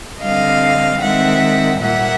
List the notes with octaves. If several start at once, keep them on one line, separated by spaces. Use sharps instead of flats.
D3 G3 C4 D#5 F5
D#3 G#3 C4 E5 F#5
A#2 G3 A#3 E5 F#5